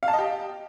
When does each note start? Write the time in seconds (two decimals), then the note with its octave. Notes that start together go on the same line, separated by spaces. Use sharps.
0.03 F5
0.08 A5
0.13 D#5
0.18 G4